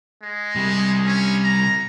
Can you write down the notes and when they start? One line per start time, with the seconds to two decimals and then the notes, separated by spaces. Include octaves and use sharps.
0.22 G#3
0.56 C3 G3
1.06 C#4
1.44 A#5